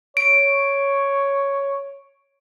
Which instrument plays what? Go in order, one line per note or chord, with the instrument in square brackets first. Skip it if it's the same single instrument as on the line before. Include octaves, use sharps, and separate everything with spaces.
[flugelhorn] C#5 [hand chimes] D7